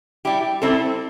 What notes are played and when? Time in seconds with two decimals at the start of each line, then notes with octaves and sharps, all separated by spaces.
0.25 G3 E4 G4
0.62 G3 C4 E4 A4